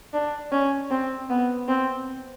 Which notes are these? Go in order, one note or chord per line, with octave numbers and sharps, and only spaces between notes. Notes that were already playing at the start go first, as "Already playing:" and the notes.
D4
C#4
C4
B3
C4